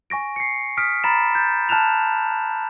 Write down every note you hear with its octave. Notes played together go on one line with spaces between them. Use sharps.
G#5 C#6 A#6 D7
C7 C#7
D#6 F6 B6 D7
A#5 B5 A6 A#6 E7
G6 A6
A5 F6 F#6 E7 F7